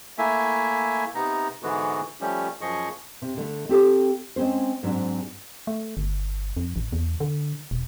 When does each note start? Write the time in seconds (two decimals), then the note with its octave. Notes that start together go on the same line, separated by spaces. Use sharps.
0.18 A3 A#3 E4 E5 G#5
1.15 C3 B3 D#4 A#5
1.63 G#2 D3 E3 G#3 B3 F#4
2.21 F3 G3 A3 C#4 G4
2.61 F#2 F3 G#4 D#5 C#6
3.22 C3
3.37 D3 A3
3.69 C4 G4 A4 F5
4.36 G#3 C4 C#4 C5
4.83 G#2 F#3 C4 D4
5.67 A3
5.97 G1
6.57 F2
6.76 A1
6.93 E2
7.20 D3
7.71 E1